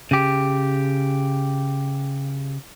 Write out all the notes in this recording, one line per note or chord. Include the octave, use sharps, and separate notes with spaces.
C#3 G4